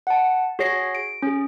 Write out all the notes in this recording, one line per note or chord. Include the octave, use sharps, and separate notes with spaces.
F#5 A5
F#4 G#4 C#5 A#6 C7
D7
C#4 G#4